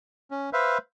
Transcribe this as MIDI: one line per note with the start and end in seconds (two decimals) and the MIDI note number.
0.31 0.50 61
0.53 0.78 71
0.53 0.78 72
0.53 0.78 76
0.53 0.78 77